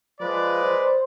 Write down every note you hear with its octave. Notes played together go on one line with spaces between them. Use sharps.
F3 G#3 B4 D5
C5